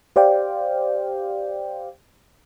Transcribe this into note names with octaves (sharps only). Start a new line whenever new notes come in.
G4 C5 D5 F5 G5